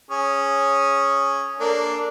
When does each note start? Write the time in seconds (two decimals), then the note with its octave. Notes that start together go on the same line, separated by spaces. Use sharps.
0.11 C#4 G#4
1.60 A#3 D4 A4